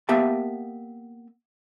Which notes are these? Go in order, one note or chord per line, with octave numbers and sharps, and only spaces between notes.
A#3 B3 G4 E5 A5